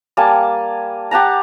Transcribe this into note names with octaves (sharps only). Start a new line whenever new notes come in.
G3 A#3 G#5 A5
G4 F#5 A5 A#5